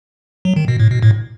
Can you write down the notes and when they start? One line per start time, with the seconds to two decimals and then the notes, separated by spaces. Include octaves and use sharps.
0.45 F#3
0.56 D#3
0.68 B2
0.79 A2
0.91 B2
1.03 A2